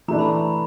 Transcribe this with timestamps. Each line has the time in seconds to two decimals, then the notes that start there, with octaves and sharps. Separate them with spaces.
0.08 E3 A3 D4 A#5
0.19 B5
0.29 A#5